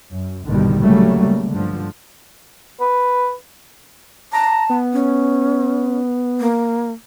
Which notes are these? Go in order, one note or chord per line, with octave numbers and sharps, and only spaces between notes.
F#2
A#1 G2 B2 D3 D#3 G3
C#3 F#3 G3 A3 A#3
G2 D3 F3
B4
A5 A#5
B3
C#4
A#3